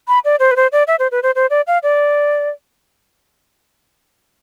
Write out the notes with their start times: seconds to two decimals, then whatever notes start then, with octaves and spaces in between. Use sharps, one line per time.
0.08 B5
0.25 D5
0.40 C5
0.51 B4
0.56 C5
0.72 D5
0.87 E5
0.99 C5
1.11 B4
1.23 C5
1.35 C5
1.50 D5
1.67 F5
1.83 D5